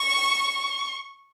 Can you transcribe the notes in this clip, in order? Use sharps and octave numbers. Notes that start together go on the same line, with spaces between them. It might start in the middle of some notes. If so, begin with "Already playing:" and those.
Already playing: C#6